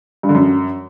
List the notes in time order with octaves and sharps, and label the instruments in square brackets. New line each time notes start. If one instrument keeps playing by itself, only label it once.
[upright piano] G2
D3
F#2